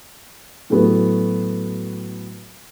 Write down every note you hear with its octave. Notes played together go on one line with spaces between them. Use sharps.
A2 F#3 A3 B3 F#4